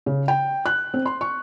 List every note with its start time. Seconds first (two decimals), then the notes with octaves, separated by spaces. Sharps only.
0.06 C#3
0.28 G5
0.66 F#6
0.94 C4
1.06 C6
1.21 C#6